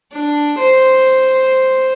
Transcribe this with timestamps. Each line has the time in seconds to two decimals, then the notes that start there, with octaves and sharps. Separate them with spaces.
0.12 D4
0.58 C5